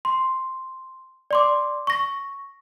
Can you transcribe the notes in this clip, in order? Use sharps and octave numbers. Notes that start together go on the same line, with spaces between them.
C6
D5 C6 D6
C#6 A#6